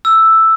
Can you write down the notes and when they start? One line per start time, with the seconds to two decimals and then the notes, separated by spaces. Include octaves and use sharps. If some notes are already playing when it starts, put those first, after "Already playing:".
0.05 E6